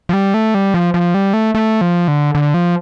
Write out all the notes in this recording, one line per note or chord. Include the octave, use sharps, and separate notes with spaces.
F3
G3
A3
G3
F3
F3
G3
A3
A3
F3
D3
D3
F3